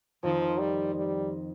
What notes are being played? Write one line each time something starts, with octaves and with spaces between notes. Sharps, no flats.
F2 D#3 F3 C4 D#4
G3
G3